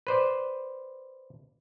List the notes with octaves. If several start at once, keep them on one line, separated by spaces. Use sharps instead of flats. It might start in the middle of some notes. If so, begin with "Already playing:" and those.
B4 C5 D5